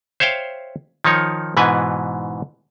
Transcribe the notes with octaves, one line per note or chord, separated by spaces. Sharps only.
C5 C#5 E5 F5 G5
D#3 F3 D#4 C#5
G#2 B2 E3 B4 G#5